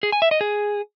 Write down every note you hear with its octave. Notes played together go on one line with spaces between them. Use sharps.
G#4
G#5
E5
D#5
G#4